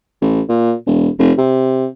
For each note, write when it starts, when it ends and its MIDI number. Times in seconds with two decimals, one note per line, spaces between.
0.22 0.41 33
0.49 0.73 46
0.86 1.08 28
1.19 1.32 29
1.38 1.87 48